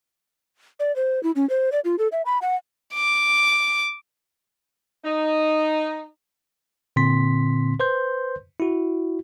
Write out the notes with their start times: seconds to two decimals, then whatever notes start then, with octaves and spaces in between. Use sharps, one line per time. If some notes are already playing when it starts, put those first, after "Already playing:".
0.80 D5
0.96 C5
1.23 E4
1.36 C#4
1.50 C5
1.72 D5
1.85 F4
1.99 A4
2.12 E5
2.26 B5
2.42 F#5
2.94 D6
5.05 D#4
6.96 A#2 D3 C4 C6 B6
7.80 B4 C5 C6 G6
8.60 E4 F#4